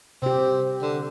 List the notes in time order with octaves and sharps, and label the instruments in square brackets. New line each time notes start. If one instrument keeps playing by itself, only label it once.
[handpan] C3 G4 [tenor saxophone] C4
[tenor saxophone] D3